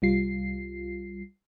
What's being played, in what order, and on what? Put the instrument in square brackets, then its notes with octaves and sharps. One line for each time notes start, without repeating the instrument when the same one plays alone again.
[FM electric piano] C2 G3 F4 C7